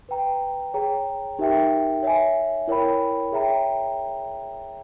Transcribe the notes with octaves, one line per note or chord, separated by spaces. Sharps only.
B4 G5 A#5
G#4 C#5 G5 A#5
D#4 G4 A#4 E5 G5
C#5 E5 G#5
E4 A#4 C#5 G5 B5
G#4 C#5 E5 G5 A#5